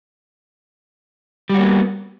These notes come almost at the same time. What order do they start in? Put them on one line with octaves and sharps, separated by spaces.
G3 F#4 A#3 B3